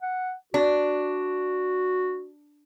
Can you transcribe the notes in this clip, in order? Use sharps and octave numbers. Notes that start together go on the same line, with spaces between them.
F#5
D4 F#4